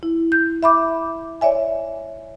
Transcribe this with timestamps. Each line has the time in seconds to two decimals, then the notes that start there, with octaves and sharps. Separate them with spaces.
0.03 E4
0.32 G6
0.63 E5 B5 D6
1.41 C#5 D5 E5 G#5